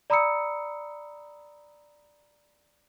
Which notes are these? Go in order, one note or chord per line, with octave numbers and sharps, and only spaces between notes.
D5 A#5 B5 D#6 E6 C#7